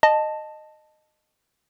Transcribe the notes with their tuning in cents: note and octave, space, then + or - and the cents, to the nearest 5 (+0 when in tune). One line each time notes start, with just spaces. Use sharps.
D#5 -15 A5 +0